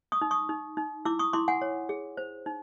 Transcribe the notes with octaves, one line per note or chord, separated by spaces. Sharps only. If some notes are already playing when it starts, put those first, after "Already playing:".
C#6 D#6
D#4
C#6 D#6
D#4
D#4
E4 D6 E6
C#6 D#6
E4 C6 D6
F#5 G#5
C#5
G#4
C5
D#4